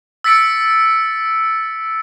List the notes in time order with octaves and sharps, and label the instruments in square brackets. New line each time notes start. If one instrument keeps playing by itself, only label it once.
[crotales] E6 A6 B6 C#7 D7